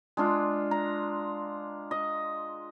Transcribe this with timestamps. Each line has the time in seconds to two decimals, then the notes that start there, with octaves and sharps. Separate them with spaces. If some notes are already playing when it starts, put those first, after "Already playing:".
0.17 G#3 D4 F4
0.71 A#5
1.91 D#5